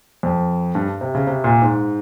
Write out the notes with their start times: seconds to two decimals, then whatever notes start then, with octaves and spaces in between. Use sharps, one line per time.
0.23 F2
0.75 G2
1.01 C3
1.15 C#3
1.27 C3
1.44 A#2
1.62 G#2